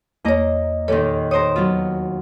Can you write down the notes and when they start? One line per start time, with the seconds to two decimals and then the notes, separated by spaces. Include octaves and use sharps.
0.25 E2 A#3 C#5 D#5 A#5
0.88 D#2 A#2 D#3 A4 C#5
1.31 A#4 C5 C#5 D#6
1.56 F#3 B3 F4